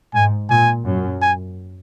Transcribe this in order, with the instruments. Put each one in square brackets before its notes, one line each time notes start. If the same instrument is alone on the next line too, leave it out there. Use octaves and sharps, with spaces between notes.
[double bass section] G#2 [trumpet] G#5
[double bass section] A#2 [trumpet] G#5
[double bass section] F#2
[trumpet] G#5